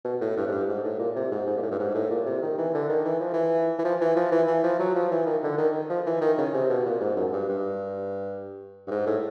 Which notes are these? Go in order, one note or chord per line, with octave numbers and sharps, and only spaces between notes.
B2
A2
G2
G#2
G2
G#2
A2
A#2
C3
G#2
G#2
A#2
A2
G2
G#2
A2
A#2
C3
D#3
E3
D3
D#3
E3
F3
E3
E3
F3
E3
F3
E3
E3
F3
F#3
F3
E3
D#3
D3
D#3
F3
E3
D#3
C#3
C3
B2
A#2
G#2
F#2
G2
G2
G2
G#2
A2